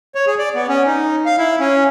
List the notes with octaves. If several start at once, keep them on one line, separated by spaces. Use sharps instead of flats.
C#5
G#4
D5
B3
C#4
D#4
F5
E4
C#4